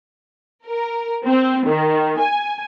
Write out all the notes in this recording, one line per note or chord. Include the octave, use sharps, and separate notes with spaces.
A#4
C4
D#3
G#5